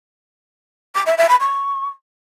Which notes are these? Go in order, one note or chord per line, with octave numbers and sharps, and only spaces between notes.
D6
E5
E5
B5
C#6